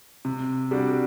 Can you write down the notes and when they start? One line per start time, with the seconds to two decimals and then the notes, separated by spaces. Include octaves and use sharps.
0.25 C3
0.71 G3 D4 F#4